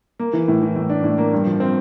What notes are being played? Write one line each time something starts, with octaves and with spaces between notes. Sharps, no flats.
A#3
E3
A2
E3
A2
D4
A2
A#3
G2
F3
C4